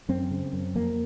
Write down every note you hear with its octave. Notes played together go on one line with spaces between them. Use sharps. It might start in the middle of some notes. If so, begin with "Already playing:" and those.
F#2 C4
C#3
F#2
F2 A#3